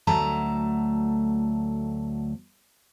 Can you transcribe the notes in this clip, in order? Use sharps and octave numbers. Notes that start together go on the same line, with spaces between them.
D2 F#3 A3 A5 A#5